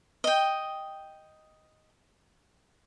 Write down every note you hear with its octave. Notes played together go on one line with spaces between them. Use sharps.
D#5 G5